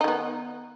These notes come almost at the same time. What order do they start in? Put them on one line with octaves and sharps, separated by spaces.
D#4 D#3 B3